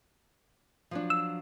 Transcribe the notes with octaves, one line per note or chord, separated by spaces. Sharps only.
F3 F#3 D4
E6